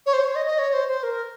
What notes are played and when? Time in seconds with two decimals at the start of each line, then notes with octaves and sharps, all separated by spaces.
0.06 C#5
0.13 C5
0.24 C#5
0.36 D#5
0.46 D#5
0.59 C#5
0.73 C5
0.88 C5
1.03 A#4